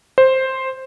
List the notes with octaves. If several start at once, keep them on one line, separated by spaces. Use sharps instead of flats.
C5